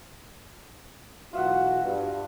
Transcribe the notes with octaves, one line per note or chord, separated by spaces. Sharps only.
B1 E3 F4 F#4 E5 F#5
G2